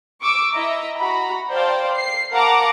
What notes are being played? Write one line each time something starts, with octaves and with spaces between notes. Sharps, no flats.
C#6 D6 E6
E4 D#5 E5 A#5
F#4 A#5 B5
C5 D5 F5 G5 A5
C7
A#4 F5 F#5 A5 A#5 D6